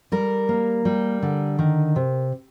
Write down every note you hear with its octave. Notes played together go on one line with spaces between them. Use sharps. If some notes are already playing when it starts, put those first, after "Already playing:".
G3 A#4
A#3
G3
D3
D#3
C3